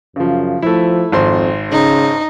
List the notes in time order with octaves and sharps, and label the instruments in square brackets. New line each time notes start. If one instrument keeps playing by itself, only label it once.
[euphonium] F#2 [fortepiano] C#3 F3
[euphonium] F3 [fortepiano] A3 E4
[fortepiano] G#1 C5 C6 [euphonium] F2
[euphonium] C#3 [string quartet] D#4